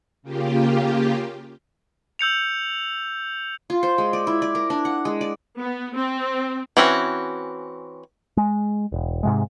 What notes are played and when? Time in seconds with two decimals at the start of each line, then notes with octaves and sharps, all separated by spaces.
0.23 C#3 A#3 F4 G4
2.19 E6 G6 C#7 F7
3.70 F4
3.83 C5
3.98 G#3
4.13 D5
4.27 E4
4.42 D5
4.55 A#4
4.70 D4
4.85 F#5
5.05 G#3
5.21 D5
5.60 B3
5.96 C4
6.77 E3 C4 C#4 E4 F#4
8.37 G#3
8.92 E1
9.23 G#2 C3 G#3